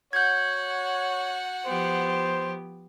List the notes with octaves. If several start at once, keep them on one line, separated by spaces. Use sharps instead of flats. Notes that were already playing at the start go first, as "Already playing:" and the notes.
F#4 C#5 F#5 G6 G#6
F3 B3 G4 C5